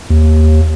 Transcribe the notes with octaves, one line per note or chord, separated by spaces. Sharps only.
D#2